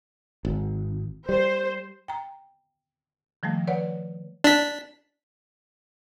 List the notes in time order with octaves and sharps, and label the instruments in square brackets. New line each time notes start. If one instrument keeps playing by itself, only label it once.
[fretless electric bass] G#1
[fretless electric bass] G3 [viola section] C5
[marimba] G5 A#5
D#3 F3 G3 A3
B4 C#5 D5 F#5
[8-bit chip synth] D4 B6